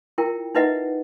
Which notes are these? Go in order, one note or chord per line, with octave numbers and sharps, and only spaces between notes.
E4 F4 A#4 G5
D#4 E4 B4 D#5 E5 F#5